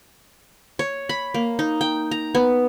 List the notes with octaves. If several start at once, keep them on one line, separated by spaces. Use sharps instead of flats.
C#5
B5
A#3
D#4
G5
A#5
B3